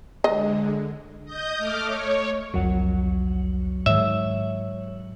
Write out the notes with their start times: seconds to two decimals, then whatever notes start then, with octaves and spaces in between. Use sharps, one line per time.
0.24 D3 G#3 D#5
1.25 D#5 D#6 G6
1.57 A3 D6 F6
1.86 C#5
2.54 G1 C2 F2 F#3 F#5
3.86 G#2 D#3 C#5 E5